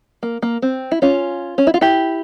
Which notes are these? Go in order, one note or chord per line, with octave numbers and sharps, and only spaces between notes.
A#3
A#3
C4
E4
C#4 F4
C#4
E4
F4
E4 G4